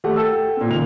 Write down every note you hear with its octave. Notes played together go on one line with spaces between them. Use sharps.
G3 A3 G4 F#5
A4 G5 A5 E6
A#2 C4
C#2 A#2 D#3 F7